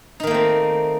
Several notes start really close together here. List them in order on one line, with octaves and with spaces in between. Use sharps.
D#4 D#3 A#3 A3 C4